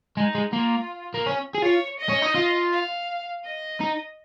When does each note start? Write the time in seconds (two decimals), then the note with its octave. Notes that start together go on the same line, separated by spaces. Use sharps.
0.17 G#3 D#4
0.35 G#3
0.53 A#3 F4
1.14 A#3
1.26 C#4
1.55 G#4
1.62 F4 C#5
1.99 D#5
2.09 C#4
2.22 D#4
2.35 F4
2.72 F5
3.44 D#5
3.81 D#4